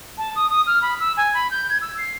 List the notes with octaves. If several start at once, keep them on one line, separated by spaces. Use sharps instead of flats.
A5
D#6
D#6
F6
B5
E6
G#5
B5
G6
G#6
E6
C7